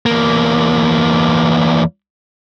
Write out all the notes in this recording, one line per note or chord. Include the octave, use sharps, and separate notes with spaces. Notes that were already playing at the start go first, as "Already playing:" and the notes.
E2 A#3